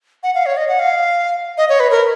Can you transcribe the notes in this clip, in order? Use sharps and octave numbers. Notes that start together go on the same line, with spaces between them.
F#5
F5
C#5
D#5
F#5
F5
D#5
C#5
B4
A#4